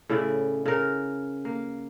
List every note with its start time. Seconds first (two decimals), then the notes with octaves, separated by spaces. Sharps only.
0.09 A2 C#3 E4 D5
0.65 C#3 A#4
1.45 A#3